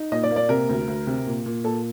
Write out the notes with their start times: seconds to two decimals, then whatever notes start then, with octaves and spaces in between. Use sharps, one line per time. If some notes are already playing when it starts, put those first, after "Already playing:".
Already playing: D#4
0.12 A#2 D#5
0.24 D5
0.31 A#3
0.36 D5
0.49 C3 A#4
0.69 D2
0.88 D2
1.07 C3
1.26 A#2
1.46 A#2
1.64 A#2 A4